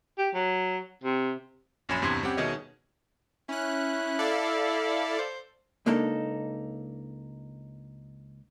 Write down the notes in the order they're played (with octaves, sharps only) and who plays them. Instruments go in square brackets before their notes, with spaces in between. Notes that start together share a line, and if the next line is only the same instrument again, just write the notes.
[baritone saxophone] G4
F#3
C3
[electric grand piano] A#1 F#2 C#5 G#5 B5 E7
E2 G2 C3 B3 C6 G#6
G3 C4 C#4 G4 F#5
B2 D#3 G#4 C#5 D#5 E5
[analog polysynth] C#4 F#6 [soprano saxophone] E4
[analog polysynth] A4 D5 F5
[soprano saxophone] C5
[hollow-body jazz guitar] C#2 A#3 D4 D#4 A4